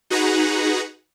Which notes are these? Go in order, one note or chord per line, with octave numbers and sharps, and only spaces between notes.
D#4 F#4 G#4 B4 F#5 A#5